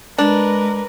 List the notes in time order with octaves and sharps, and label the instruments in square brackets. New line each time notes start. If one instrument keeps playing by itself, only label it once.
[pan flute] G#3 [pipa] D4 [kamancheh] A#4 B4